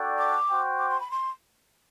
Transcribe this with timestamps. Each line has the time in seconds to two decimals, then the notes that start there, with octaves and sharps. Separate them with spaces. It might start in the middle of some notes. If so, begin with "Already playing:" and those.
Already playing: D4 F#4 A4 D5 G5
0.18 D6
0.48 F#4 C5 G5
0.78 D6
0.89 C6
1.00 B5
1.11 C6